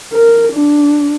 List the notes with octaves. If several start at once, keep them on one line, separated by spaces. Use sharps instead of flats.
A#4
D4